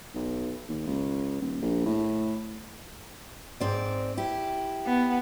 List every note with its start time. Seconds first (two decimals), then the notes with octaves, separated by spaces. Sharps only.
0.15 B1
0.69 D#2
0.87 C#2
1.41 D#1
1.62 A#1
1.86 A2
3.60 G#2 C4 D5
4.17 E4 G4
4.86 B3